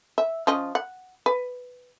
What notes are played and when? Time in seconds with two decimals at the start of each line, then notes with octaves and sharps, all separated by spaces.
0.18 E5
0.47 F3 C#4 D#5
0.75 F#5
1.26 B4